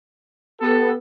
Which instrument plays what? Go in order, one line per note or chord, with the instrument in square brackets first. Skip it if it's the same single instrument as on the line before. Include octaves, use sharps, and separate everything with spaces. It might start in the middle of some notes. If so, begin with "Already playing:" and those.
[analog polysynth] B3 [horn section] G4 A4